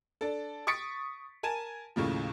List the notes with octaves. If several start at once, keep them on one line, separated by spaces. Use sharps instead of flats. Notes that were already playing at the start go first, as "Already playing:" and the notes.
D4 A4
C#6 D#6 A6 B6 C#7 D7
A#4 G#5 A5 D#7 E7
D#2 A2 C#3 F3